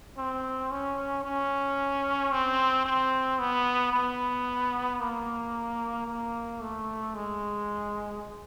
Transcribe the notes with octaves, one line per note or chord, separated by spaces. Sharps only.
C4
C#4
C#4
C4
C4
B3
B3
A#3
A#3
A3
G#3